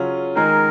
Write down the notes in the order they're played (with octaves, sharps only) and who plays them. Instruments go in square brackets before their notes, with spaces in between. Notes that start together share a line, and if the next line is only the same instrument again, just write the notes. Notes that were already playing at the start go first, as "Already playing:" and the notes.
Already playing: [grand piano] C#3 F#3 C#4 F4
[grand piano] D#3 G#3 D#4 G#4 [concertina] A#4